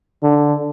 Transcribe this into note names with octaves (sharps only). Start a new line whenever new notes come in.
D3